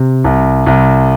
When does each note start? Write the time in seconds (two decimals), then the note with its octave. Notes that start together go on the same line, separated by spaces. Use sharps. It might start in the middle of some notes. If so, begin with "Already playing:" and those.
Already playing: C3
0.24 C2
0.66 C2